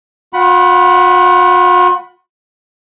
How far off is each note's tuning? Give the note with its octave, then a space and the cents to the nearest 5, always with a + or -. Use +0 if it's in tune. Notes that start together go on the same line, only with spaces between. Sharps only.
F4 +45 F#5 +20 B5 +5